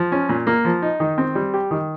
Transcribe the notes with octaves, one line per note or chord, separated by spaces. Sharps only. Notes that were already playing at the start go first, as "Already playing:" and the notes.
Already playing: F3
C#4
A#2
A#3
F3
D#4
D#3
C4
G3
G4
D#3